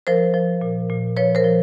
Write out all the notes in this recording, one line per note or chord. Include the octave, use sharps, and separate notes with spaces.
F3 A#4 C5
F3
A#2
A#2
F3 B4 C#5
A#4 C5
F3